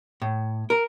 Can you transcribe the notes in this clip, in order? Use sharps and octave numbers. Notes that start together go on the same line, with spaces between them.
A2
A#4